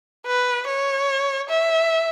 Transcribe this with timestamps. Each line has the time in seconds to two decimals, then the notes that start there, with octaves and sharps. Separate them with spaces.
0.27 B4
0.67 C#5
1.49 E5